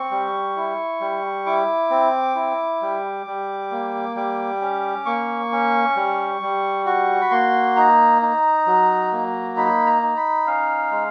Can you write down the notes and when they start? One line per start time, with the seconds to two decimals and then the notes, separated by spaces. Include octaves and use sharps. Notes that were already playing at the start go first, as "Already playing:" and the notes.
Already playing: C4 C#6
0.11 G3
0.56 E4
1.01 G3
1.46 E4 D6
1.91 C4
2.35 E4
2.82 G3
3.26 G3
3.71 A#3
4.16 G3 D6
4.61 C#4
5.06 A#3 C#6
5.52 C#4
5.96 G3
6.42 G3
6.86 F#4 C#6
7.21 B5
7.31 A#3 C6
7.76 D#4 A#5
8.22 D#4
8.67 F#3
9.12 A#3
9.57 D#4 B5
9.86 A#5
10.02 D#4
10.17 B5
10.47 C#4 F5
10.91 G#3